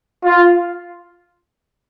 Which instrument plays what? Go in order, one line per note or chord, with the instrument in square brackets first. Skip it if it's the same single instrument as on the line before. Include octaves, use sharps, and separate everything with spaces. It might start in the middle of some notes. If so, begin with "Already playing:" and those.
[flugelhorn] F4